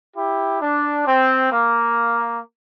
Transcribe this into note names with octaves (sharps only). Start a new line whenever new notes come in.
E4 G4
D4
C4
A#3